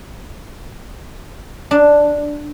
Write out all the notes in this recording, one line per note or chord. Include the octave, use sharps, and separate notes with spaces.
D4